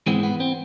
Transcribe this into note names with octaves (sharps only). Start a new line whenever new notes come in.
G#2 E3 G#3 B3 C4
B3
C4